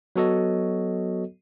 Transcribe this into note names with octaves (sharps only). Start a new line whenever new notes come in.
F#3 B3 F#4 A4 C#5 D#5